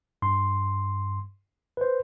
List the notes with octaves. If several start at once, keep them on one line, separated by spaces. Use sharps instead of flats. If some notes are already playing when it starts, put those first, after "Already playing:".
G2 C6
B4 C5